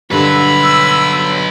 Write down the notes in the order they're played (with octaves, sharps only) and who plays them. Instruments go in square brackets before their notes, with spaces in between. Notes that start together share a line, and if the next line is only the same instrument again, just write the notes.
[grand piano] G2 D3 [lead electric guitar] F#3 B4 [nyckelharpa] B5 [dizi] E6